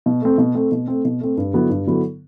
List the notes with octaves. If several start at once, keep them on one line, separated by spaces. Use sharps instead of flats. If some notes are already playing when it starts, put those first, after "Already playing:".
B2
A3 C4
B2
A3 C4
B2
A3 C4
B2
A3 C4
G2
D3 F#3 B3 E4
G2
D3 F#3 B3 E4